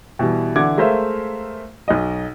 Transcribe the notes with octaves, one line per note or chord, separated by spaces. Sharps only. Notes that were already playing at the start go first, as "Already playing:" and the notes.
B2 E3 G3
D3 E3 F#5 D6 G#6
G#3 A3 A#4 C5 E5 F5
B1 D#5